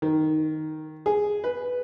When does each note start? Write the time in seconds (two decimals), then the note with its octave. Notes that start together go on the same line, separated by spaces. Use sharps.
0.02 D#3
1.06 G#4
1.44 B4